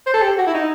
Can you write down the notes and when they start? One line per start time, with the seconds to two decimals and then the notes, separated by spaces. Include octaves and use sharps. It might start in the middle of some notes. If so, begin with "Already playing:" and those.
0.07 C5
0.14 A4
0.22 G4
0.38 F#4
0.47 E4
0.54 D#4